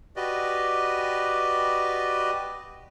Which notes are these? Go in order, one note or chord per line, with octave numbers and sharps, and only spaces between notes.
F#4 G4 B4 D5 D#5